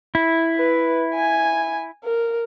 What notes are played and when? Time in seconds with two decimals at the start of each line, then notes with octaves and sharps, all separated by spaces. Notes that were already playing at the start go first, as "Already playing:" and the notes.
0.15 E4
0.56 B4
1.14 G#5
2.05 A#4